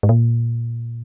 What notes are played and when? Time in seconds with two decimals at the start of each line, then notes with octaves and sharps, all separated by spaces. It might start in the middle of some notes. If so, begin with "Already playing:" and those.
0.03 G#2
0.09 A#2